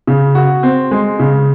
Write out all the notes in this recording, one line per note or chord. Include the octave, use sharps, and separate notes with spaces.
C#3
F#4
C4
G#3
C#3